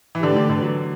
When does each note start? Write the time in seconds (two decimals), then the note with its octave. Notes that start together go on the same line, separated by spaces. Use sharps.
0.15 E3
0.22 D3 A3 D4 G4 B4 D5
0.36 D3
0.49 D3
0.63 F#3